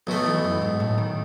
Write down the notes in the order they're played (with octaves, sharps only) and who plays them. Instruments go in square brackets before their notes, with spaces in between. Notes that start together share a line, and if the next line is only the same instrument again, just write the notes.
[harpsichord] B1 B2 A3 [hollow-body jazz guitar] F#3
[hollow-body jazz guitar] E3
F#2
G#2
A2
D#3